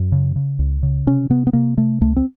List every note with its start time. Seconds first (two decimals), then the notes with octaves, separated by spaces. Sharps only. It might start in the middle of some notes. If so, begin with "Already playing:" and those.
Already playing: F#2
0.12 C#3
0.36 C#3
0.59 C#2
0.83 C#3
1.07 C3 C#4
1.30 C3 B3
1.47 B3
1.53 C3 A#3
1.77 C3 A3
2.01 C#2 A3
2.16 C4